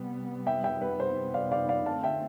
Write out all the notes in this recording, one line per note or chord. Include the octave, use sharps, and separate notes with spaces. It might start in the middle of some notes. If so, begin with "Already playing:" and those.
Already playing: C3 G3 B3
E5 G5
E5 G5
B4
C5
D5 F5
D5 F5
D5 F5
D3 A3 C4 F5 A5
E5 G5